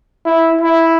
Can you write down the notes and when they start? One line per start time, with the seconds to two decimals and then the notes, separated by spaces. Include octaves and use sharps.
0.26 E4
0.61 E4